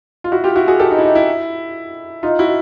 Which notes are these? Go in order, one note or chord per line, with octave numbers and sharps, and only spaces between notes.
F4
E4 F#4
F4 G4
E4 F#4
F#4 G#4
G4 A4
D#4
E4
D#4
E4
D#4 F4
E4 F#4